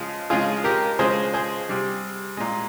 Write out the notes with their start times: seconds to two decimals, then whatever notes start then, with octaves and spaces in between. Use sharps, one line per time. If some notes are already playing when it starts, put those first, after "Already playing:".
Already playing: C#3 F3 G#3
0.30 C#3 F3 G#3 F4 G#4
0.64 G4 A#4
0.99 C#3 F3 G#3 G#4 C5
1.34 G#4 C5
1.69 C3 G3
2.37 A#2 G#3